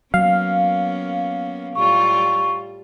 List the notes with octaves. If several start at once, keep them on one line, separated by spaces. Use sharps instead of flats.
F#3 A#3 B3 C#4 F5
A2 G3 F4 C#6